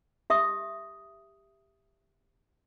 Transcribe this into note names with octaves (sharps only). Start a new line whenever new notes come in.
G4 E5 D#6